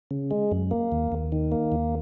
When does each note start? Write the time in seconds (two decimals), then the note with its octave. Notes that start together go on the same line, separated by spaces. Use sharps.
0.11 C#3
0.31 G#3
0.52 F#2
0.71 A#3
0.92 D#2
1.12 D#2
1.32 D#3
1.52 A#3
1.72 D#2